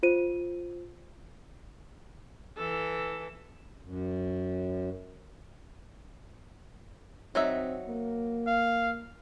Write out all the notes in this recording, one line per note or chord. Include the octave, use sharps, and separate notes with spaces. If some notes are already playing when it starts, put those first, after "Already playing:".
F4 C5 D#7
E3 A4
F#2
F#3 C4 D#4 E5
A#3
F5